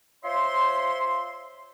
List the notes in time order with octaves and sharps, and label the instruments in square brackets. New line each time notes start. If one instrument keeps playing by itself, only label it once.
[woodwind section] F4 C5 C#5 E5 C6